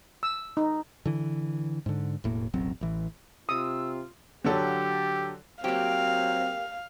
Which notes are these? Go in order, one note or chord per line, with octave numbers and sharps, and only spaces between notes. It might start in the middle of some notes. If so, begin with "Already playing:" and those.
E6
D#4
D3 E3
G#2 D3
E1 A2 A#3
E1 A1 F#3 C4
A1 E3
C3 F4 D#6 E6
D3 F#3 G4 A4
F#3 A#3 C4 G4 F5